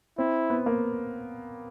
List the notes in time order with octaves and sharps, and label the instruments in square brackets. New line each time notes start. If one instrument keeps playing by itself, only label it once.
[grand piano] C4 [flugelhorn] E4
[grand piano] B3
A#3